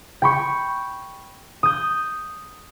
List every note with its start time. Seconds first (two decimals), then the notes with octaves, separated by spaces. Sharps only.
0.22 G5 B5 C#6
1.63 D#6 G6